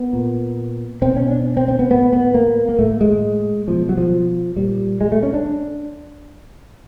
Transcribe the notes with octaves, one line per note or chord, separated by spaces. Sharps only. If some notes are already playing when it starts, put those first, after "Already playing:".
Already playing: B3
A#2
B2 C4
C#4
D4
C4
C4
B3
A2 B3
B3
A#3
A#3
A2 A3
G#3
B2 F3
F#3
F3
A#2 G3
G#3
A3
C#4
D4